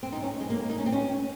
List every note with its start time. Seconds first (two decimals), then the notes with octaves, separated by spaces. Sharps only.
0.03 C4
0.12 D#4
0.22 C#4
0.41 G#3
0.50 A#3
0.70 D#4
0.78 C#4
0.86 C4
0.92 C#4